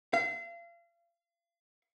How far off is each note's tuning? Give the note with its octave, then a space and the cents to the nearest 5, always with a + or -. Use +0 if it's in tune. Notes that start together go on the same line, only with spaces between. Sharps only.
F5 -35